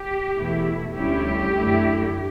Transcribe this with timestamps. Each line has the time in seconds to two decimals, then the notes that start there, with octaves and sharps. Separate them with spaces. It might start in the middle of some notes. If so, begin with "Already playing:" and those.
Already playing: G4
0.36 E2 B2 A3 E4
0.96 D2 D3 G3 C#4 E4 G4
1.56 F#2 D3 A3 E4